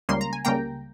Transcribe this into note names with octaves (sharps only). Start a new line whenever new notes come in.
C#2 C#3 G3 A#3 C6
A#5
G#5
C#2 C#3 G3 A#3 G5 A#5